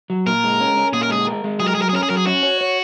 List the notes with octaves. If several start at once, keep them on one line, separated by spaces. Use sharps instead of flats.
F#3
A#2 A#4
G#3
C#4
C#4
A#2 G#4
A#4
G#3 G#4
A#4
G#3
F#3 G#4
A#4
F#3 G#4
A#4
G#4
C#4 A#4
G#4
F#3 A#4
G#4
C#4 F#4
C#5
C#5